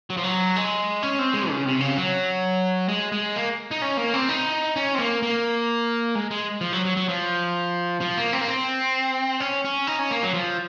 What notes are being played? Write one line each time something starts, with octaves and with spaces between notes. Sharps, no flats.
F#3
F3
F#3
G#3
C#4
C4
G#3
C#3
C3
C#3
F#3
G#3
G#3
A#3
D#4
C#4
A#3
C4
D#4
C#4
C4
A#3
A#3
G#3
G#3
F3
F#3
F#3
F#3
F3
F3
A#3
C4
A#3
C4
C#4
C#4
D#4
C#4
A#3
F#3
F3